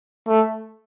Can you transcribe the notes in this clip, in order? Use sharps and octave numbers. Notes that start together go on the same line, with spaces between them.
A3